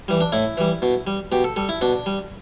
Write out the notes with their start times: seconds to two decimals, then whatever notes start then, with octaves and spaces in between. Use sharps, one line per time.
0.08 E3 G3
0.21 D4
0.32 A2 E4
0.57 E3 G3
0.82 B2
1.07 G3
1.32 B2 G4
1.44 A4
1.56 G3 A4
1.69 E4
1.81 B2 D4
2.06 G3